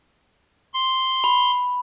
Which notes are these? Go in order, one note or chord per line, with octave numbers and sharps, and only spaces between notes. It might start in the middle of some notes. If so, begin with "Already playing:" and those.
C6
B5